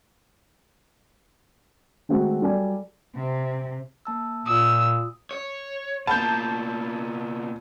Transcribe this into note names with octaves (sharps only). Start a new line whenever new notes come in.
D#3 G#3 A3 C4 F#4
F#3 G3 A4 D5 G#5
C3
A#3 A5 E6
A#2 F4 D#6 E6
C#5
B2 A#3 A5 G6